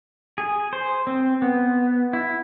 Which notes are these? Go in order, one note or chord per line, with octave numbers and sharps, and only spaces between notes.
G#4
C5
C4
B3
E4